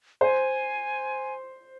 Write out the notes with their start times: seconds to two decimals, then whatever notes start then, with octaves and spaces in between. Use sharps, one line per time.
0.21 C5 G#5